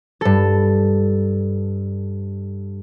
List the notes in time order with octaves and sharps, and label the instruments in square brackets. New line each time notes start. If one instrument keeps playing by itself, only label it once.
[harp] G2 A4